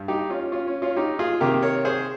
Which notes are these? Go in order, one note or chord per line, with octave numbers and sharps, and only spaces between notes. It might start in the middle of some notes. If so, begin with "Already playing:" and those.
Already playing: G2 G3
D#4 G4
C#4 F4
C#4 F4
C#4
C#4 F4
D#4 G4
F4 G#4
C3 D#3 A#3 G4 A#4
A#4 C#5
G#4 C5